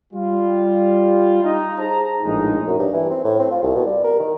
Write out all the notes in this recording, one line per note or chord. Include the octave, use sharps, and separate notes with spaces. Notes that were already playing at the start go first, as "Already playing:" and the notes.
G3 F4
D#4
G#4 C5 A5 A#5
A#1 A2 G#3 D#4
F#2
G2
E3
C4
A2
C4
F4
C2
B2
G3
A#4
D#3